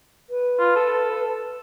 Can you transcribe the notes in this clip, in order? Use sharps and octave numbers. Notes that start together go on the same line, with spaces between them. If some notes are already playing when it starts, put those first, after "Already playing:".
B4
F4
A4